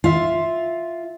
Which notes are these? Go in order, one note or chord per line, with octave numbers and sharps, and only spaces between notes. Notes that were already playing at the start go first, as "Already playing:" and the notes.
F4 E5